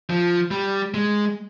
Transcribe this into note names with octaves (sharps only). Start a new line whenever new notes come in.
F3
G3
G#3